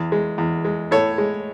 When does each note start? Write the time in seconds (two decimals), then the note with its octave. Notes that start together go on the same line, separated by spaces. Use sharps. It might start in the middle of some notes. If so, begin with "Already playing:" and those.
Already playing: E2
0.12 G#3
0.38 E2
0.65 G#3
0.91 A2 A4 C#5
1.18 G#3